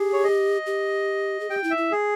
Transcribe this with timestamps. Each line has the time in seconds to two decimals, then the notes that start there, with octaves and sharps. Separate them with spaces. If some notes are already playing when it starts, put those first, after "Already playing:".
Already playing: G4 G#4
0.13 C#5
0.24 D#5
0.66 G4
1.40 G#4
1.50 G4 G5
1.64 E4
1.70 E5
1.78 E4
1.92 G#4